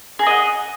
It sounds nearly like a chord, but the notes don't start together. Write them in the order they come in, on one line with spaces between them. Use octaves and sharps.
G#4 A#5 D#5 F#5